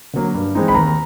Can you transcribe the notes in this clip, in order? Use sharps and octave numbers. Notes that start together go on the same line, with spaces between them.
D3 F#3 A#3
G2
E3 G#3 C4 D#4
B5
D#2 A#5